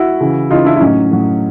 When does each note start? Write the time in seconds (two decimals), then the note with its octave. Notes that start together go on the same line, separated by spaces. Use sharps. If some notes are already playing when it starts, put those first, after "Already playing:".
Already playing: E4 F#4
0.21 C#3 E3
0.50 C#3 E3 D#4 F4
0.65 D4 E4
0.76 E4
0.80 A2 F#3 C#4 D#4
1.11 A2 F#3